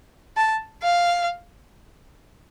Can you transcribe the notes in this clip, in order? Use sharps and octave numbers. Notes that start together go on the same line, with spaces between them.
A5
F5